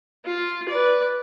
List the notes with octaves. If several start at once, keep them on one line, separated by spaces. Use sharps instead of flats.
F4
B4 D5